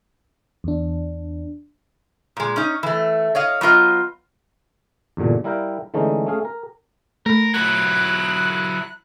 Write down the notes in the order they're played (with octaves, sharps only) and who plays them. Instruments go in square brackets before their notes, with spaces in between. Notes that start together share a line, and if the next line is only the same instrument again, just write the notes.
[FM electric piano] E2 D4
[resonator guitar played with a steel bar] A#2 G#3
C#4 D#4
E3 A3
C#5 D#5 F5
F#3 B3 F4 D#5
[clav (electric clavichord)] E2 G2 A#2 D3
G3 E4 A#4 F5 G5
D3 E3 G#3 A3 C#4 D#4
A3 C#4 G#4 F5
A#4
[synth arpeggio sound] A3 B5 [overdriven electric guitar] A#4
[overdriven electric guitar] F#3 E4 [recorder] F#6